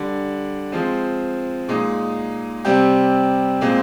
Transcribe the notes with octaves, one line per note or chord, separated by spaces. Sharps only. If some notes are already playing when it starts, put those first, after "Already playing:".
Already playing: D3 G3 D4
F3 G#3 C4
A#2 G#3 D#4
C3 G3 C4 G4
A#2 G#3 C4